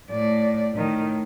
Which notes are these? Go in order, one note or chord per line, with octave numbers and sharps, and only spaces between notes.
A2 D5
A2 D#3